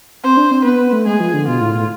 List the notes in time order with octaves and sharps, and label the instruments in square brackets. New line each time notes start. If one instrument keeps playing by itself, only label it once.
[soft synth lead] C4 [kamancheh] C5
[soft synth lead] D4
C4
[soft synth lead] B3 [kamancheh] B4
[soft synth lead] B3
A3
[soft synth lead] G#3 [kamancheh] G#4
[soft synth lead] F3
D3
[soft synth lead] B2 [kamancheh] F4
[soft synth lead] A2
A2